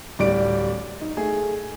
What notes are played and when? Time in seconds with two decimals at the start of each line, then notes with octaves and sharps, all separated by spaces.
0.19 D1 G3 D5 D7
1.01 D#4
1.17 A3 G#4